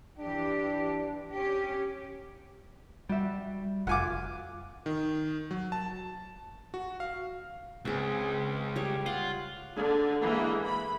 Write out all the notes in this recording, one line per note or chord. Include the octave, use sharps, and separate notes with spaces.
E3 D4 G4
C#4 G4
G3 F#4 E5
F1 F4 F#4 F#5 G#5 D6
D#3
F#3
A5
F#4
F5
C#2 C4 G#4
G3 C#5
F4 F#5
D3
E3 G#3 A#3
B5